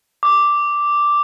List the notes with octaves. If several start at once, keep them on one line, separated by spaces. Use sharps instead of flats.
D6